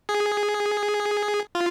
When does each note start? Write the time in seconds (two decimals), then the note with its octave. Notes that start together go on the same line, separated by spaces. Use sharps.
0.09 G#4
1.55 F4